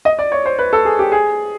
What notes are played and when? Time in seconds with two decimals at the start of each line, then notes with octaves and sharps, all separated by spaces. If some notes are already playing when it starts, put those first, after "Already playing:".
0.05 D#5
0.19 D5
0.32 C#5
0.46 C5
0.59 B4
0.73 A4
0.85 G#4
0.99 G4
1.12 G#4